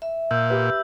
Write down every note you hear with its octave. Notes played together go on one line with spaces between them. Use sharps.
E5
A#2 E6 G6
G4 B4